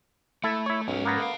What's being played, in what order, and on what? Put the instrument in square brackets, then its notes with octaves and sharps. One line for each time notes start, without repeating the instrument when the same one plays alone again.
[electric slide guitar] A3 [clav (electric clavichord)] E4 A4
[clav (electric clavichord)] E4 C#5
[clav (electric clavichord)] B1 [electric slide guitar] G#2 C#4
[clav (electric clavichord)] A#3 B3 A#5
[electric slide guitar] A4 D#5 F5